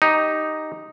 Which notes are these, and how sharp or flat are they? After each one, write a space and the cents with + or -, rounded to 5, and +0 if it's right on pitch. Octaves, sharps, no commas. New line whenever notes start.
D#4 +0 G4 +0